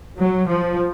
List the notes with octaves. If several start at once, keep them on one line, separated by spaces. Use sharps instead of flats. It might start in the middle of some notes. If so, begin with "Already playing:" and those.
F#3
F3